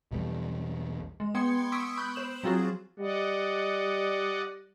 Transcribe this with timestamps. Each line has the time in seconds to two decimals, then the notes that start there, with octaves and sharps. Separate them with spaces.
0.12 B1 E2 G3
1.20 G#3
1.35 B3 G5 C6 G#6 C#7
1.72 C#6 D#6 E6 B6 D7
1.97 B5 F#6 G6
2.15 C5 E7 F#7
2.43 F#3 C4 F4 F#4 G#4
2.99 G3 D5 D#5 F#5